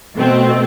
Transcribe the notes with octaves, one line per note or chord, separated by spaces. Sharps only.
B2 A3 C4